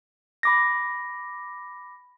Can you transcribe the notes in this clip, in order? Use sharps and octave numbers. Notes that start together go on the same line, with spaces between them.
B5 D6 A#6